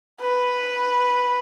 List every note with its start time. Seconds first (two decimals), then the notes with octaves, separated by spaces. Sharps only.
0.21 B4